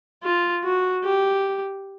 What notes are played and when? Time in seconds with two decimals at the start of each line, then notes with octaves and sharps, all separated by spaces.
0.24 F4
0.64 F#4
1.04 G4